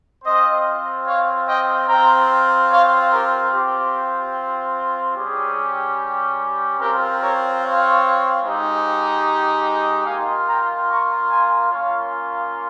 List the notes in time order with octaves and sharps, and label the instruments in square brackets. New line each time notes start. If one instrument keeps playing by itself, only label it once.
[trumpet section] C4 F4 C5 D#5
C#5 F5
D#5 G5
C4 F4 G5 A#5
C#5 F5
G4 A#4
C4 F4 G4
G3 C#4 G4 G#4
C4 F4 G4 A#4
A#4 C#5
C#5 F5
G#3 D#4 G4
A#3 F4 F5 G#5
G5 A#5
A#5 C#6
G#5 C6
A#3 C#4 F4 C#5 F5